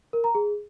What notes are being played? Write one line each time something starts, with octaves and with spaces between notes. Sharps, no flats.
A#4
A#5
G#4